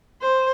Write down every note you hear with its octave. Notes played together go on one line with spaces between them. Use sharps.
C5